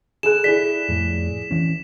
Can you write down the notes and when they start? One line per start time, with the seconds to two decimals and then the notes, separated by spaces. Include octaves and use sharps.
0.23 G#4 A4 F#6 E7
0.44 E4 G#4 D5 B6
0.89 F2 A2
1.51 E3 C#4